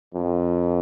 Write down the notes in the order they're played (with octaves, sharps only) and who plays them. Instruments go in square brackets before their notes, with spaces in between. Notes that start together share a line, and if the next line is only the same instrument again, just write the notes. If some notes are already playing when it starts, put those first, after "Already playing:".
[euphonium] F2